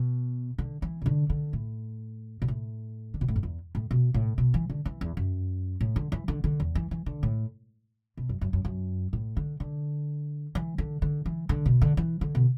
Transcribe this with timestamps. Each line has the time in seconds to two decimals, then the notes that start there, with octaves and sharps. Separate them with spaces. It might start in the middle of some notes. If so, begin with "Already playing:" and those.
Already playing: B2
0.58 D3
0.82 E3
1.02 B2
1.06 D3
1.30 D3
1.53 A2
2.42 B2
2.48 A2
3.14 D3
3.21 B2
3.28 A2
3.36 F#2
3.43 E2
3.75 A2
3.91 B2
4.14 A2
4.38 B2
4.54 E3
4.70 D3
4.85 E3
5.01 E2
5.17 F#2
5.81 A2
5.96 D3
6.12 E3
6.28 D3
6.44 D3
6.60 E2
6.75 E3
6.91 E3
7.06 D3
7.23 A2
8.17 B2
8.29 F#2
8.41 F#2
8.53 F#2
8.65 F#2
9.13 A2
9.37 D3
9.60 D3
10.55 E3
10.78 D3
11.02 D3
11.26 E3
11.49 D3
11.66 B2
11.82 D3
11.97 E3
12.21 D3
12.35 B2